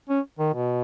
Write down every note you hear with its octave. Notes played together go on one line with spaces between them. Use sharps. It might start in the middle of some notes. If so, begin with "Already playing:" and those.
C#4
D#3
B2